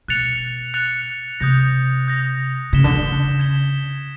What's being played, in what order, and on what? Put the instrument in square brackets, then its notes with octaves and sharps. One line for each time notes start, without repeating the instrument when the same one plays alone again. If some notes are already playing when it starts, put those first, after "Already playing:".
[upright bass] B2 [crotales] F#6 A6 C#7 F7
[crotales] F#6 A6 C#7 F7
[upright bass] C3 [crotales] D#6 G6 A#6
[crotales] D#6 G6 A#6
[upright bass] C#3 [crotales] G#6 B6 E7 G7
[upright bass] D3
C#3
[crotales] G#6 B6 E7 G7